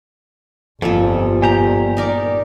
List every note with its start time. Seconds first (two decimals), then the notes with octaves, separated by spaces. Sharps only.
0.82 G1 F2 A#2 F3 A4
1.42 A#2 G4 G#5 A#5
1.97 D#4 A#4 D5